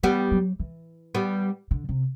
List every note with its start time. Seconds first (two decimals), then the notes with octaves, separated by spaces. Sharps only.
0.03 E3 G3 B3
0.31 F#3
0.60 E3
1.15 G3 B3
1.71 D3
1.89 C3